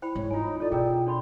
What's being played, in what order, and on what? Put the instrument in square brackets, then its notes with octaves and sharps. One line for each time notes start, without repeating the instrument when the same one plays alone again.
[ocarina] E4 [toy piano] C5 G5 B5
[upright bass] G#2 [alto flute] C#5
[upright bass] D#3 [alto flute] D#4 [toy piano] F4 G#5
[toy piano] E4 A4 C#5 [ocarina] F4 [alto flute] D5
[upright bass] B2 [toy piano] G#4 A#4 D5 [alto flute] G5
[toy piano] D4 C#5 B5 [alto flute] C6